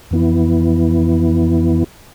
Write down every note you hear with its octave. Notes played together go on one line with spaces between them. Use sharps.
F2 E3 B3 E4